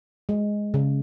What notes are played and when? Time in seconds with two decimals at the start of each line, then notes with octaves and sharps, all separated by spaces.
0.29 G#3
0.74 C#3